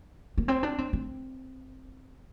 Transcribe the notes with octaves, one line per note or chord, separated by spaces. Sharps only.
A#3
C4
D4
C4
C4